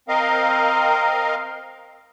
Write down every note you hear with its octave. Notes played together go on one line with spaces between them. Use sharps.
C4 A#4 D#5 F5